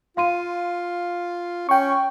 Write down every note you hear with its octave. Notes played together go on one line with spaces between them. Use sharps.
F4 F5 C6 D#7
C#4 G5 C#6